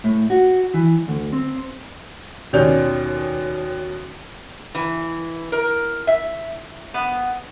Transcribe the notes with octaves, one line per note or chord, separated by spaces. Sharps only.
A2
F#4
E3
D2
C4
D#2 B2 C#4 D5 G6 F7
E3
A#4
E5
B3